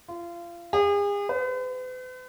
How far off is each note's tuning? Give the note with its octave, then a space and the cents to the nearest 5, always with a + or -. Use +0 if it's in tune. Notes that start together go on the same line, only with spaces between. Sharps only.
F4 -30
G#4 -40
B4 +45